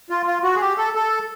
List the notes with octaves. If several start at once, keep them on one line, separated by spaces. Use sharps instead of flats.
F4
F4
F#4
G#4
G4
A4
A4